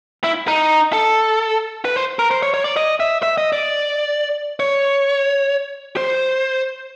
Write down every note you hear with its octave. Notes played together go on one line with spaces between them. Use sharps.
E4
D#4
A4
B4
C5
A#4
C5
C#5
C#5
D5
D#5
E5
E5
D#5
D5
C#5
C5